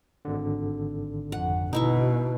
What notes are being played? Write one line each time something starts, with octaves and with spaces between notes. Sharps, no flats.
G#1 D3
F2 F#5
B2 D#4 E4 C#6